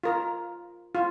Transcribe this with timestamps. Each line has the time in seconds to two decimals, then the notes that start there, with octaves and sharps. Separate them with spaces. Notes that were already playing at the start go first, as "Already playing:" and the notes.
0.03 F4 A#4
0.95 F4